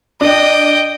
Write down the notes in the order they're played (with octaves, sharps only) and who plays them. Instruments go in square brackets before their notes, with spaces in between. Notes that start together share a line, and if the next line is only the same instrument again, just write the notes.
[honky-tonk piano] D4 [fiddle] D#5 G5